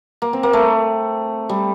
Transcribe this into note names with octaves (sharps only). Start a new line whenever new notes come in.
A#3
C4
A#3
A3
G3